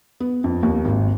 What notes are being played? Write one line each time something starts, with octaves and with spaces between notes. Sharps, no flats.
B3
F2
D#2
G#1